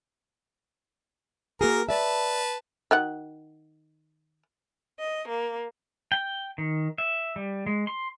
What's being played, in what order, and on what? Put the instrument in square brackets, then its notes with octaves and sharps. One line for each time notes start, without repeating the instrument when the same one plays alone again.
[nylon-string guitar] A#3 F#4 G#4 [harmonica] A#4 A#5
[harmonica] B4 A5 [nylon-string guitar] D5 E5
[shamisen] D#3 F#4 F#5
[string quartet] D#5
A#3
[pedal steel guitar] G5
D#3
E5
G3
G#3
C6